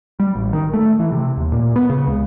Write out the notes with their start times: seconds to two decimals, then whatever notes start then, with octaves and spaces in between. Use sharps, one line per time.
0.20 G3
0.35 A1
0.53 D#3
0.73 A3
1.00 E3
1.12 C3
1.37 D#2
1.52 A#2
1.76 B3
1.90 C#3
2.07 C#2